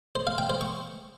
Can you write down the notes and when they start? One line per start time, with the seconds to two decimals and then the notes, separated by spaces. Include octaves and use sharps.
0.15 C5
0.27 F5
0.38 G5
0.50 C5
0.61 C#6